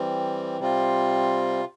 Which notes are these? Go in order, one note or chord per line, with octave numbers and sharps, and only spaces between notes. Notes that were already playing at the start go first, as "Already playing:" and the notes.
Already playing: E3 G3 C4
C3 G3 C4 F4